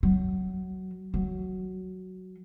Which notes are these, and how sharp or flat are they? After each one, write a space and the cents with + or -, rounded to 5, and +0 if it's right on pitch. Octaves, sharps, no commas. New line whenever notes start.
F#3 +15
F#3 +5